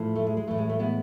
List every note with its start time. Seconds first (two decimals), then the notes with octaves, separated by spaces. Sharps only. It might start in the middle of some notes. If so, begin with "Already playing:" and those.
Already playing: A2 F3
0.15 A3
0.27 G#3
0.37 G#3
0.47 A2 E3 A3
0.58 G#3
0.69 A3
0.79 G#3 B3